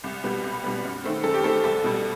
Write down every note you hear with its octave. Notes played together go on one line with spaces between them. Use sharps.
C2
B2 G3 B3
C2
B2 G3 B3
F#2
D#3 A3 C4
F#2 A4
G4
D#3 A3 C4 A4
C2 A4
B2 G3